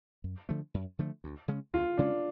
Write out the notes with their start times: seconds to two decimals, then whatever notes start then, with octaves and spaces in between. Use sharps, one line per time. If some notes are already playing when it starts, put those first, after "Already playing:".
0.24 F#2
0.49 D3 F3 A3
0.74 F#2
0.99 D3 F3 A3
1.24 D2
1.48 C#3 G#3 C#4
1.74 D2 F4
1.98 C#3 G#3 C#4 D4